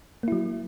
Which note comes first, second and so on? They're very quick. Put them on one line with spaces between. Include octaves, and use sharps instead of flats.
A#3 E4 F#3